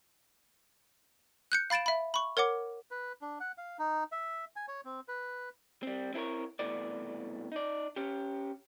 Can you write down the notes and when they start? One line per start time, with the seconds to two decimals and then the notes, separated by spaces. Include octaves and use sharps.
1.52 F#6 G6 C#7
1.70 F5 B5 A6 D7 E7
1.86 E5 B5
2.14 B5 C#6
2.37 A#4 C#5 F#5 D6
2.91 B4
3.22 D4
3.40 F#5
3.58 F5
3.79 D#4
4.12 E5
4.56 G#5
4.68 C#5
4.85 C4
5.08 B4
5.83 G3 C4
6.14 C4 E4 A4 A#4 C#5
6.59 C2 B2 E3 A3 D5
7.52 D#4 D5
7.96 C#4 G4